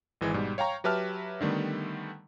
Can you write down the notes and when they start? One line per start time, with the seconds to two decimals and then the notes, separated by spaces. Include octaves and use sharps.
0.21 G#1 E3 G#3
0.34 G#2 B2 G3
0.58 C#5 F5 G5 A#5 C#6
0.84 F#3 G4 B4 E5 A5 F6
1.41 D3 D#3 G3 A3 B3